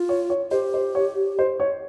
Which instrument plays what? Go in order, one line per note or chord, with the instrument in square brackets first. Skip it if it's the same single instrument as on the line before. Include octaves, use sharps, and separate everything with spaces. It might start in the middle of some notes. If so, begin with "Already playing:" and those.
Already playing: [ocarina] F4
[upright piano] C#5
C#5
[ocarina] G4 [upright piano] C5
[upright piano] C5
C#5
C5
C#5